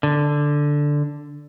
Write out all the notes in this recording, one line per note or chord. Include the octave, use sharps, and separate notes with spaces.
D3